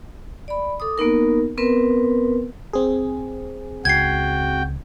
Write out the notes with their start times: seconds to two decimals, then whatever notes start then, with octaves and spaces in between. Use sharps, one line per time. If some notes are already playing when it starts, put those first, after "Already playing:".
0.48 D5 B5
0.80 A4 D6 D#6
0.98 A#3 B3 D#4 A#4
1.58 B3 C4 A#4 B4
2.73 C4 G#4
3.85 C#2 F#4 G5 G#6 C7